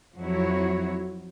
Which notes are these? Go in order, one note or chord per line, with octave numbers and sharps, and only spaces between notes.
F2 F3 F#3 E4 F#4 C#5